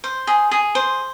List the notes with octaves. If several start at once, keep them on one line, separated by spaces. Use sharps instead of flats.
C5
G#4
G#4
C5